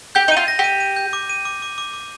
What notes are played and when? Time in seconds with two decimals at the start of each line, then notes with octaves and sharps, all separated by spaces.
0.15 G4 G6
0.28 D#4
0.32 F4 D#7
0.48 A#6
0.59 G4
0.64 D#7
0.80 D#7
0.96 G6
1.13 D6
1.29 D#7
1.45 D6
1.62 D6
1.78 D6
1.94 D6